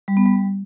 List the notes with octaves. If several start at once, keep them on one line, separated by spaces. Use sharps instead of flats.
G3
B3
G3